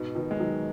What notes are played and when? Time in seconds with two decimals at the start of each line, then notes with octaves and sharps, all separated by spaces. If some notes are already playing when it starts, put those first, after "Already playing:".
Already playing: G#2 B2
0.15 B2 D#3
0.31 G#3
0.40 D#3 F#3